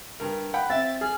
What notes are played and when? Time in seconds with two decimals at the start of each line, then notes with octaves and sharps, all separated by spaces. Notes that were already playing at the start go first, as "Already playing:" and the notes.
0.20 G2 A#4
0.54 F#5 G5 B5
0.70 C4 E5 A6
1.01 G#4 F6